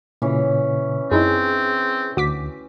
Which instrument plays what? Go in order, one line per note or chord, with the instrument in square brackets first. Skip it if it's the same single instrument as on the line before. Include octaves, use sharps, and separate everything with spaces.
[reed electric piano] A#2 C#3 [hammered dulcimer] E3 C#4
[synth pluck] F#2 D#4 E4 [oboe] C4 [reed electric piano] G#4
[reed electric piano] D2 [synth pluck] F#4 D6 B6